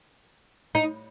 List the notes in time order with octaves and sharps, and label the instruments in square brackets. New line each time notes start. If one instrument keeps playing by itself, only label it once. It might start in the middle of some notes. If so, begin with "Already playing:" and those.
[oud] D#4